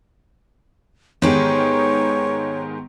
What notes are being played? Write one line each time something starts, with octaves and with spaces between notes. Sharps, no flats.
G#2 D#3 B3 G4 G#4 C#5